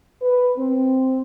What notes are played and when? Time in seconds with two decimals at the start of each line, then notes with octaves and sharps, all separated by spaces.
0.22 B4
0.57 C4